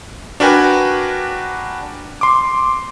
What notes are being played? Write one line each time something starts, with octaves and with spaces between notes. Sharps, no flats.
D4 F#4 A#4 B4 G5 G#5
C6 D6